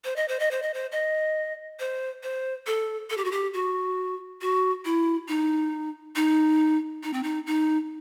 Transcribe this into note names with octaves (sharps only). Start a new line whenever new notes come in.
C5
D#5
C5
D#5
C5
D#5
C5
D#5
C5
C5
A4
A4
G4
F#4
G4
F#4
F#4
E4
D#4
D#4
D#4
C4
D#4
D#4